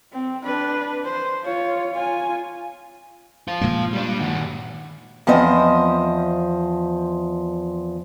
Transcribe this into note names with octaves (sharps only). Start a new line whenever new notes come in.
C4
D4 B4
C5
F4 C#5
F4 G#5
F4 C5
A#2 G#3 A#3
G3 D4
D#3 F#4
E2 F3 C4 C5 D#5